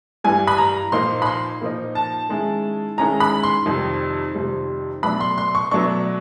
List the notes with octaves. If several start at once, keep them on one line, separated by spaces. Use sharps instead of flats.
G2 E3 G3 G#5
B5
A#5
A#2 F3 A#3 D#4 C6
B5
C6
A#2 F3 A#3 D#4
A5
D#3 G#3 C#4 E4
D#3 G#3 C#4 E4 A#5
B5
C6
F2 C3 D#3 G3
F2 C3 D#3 G3
B2 F#3 A3 D4 B5
C6
C6
C#6
B2 F#3 A3 D4 C#6